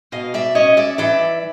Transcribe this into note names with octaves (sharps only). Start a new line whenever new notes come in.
B2 D#5 F5
D5 E5
C#4 C#5 D#5
D5 E5
E3 D5 E5